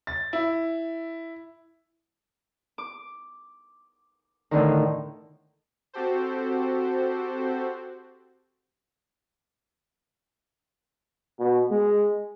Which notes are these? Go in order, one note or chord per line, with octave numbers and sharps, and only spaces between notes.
A6
E4
D6
A2 D3 D#3
C4 F#4 G4 A4 C5
B2
G#3